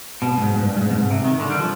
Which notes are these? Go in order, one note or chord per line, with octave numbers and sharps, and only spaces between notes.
B2
G2
G#2
G#2
G2
G2
G#2
B2
G#2
C3
D#3
D3
G3
F3